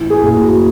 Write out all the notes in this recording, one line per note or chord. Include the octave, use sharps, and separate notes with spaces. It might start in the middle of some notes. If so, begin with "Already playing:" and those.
Already playing: A1 E3
G#4
F#1
F#4